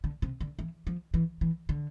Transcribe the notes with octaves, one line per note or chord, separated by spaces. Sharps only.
D3
C3
D3
E3
F3
E3
E3
D3